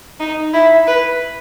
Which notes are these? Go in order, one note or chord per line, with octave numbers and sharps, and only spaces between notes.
D#4
E4
B4